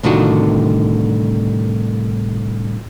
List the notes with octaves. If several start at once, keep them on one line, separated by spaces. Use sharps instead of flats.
C2 A2 D3 D#3 F4 F#4